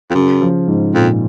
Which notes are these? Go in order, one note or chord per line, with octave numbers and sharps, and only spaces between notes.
F2
F#2 C#3
F3
G#2
F2 A#2